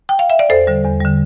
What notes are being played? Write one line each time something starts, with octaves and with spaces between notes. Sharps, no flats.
G5
F5
E5
D5
E2 A4 C5
D3 G3
E2
D3 G3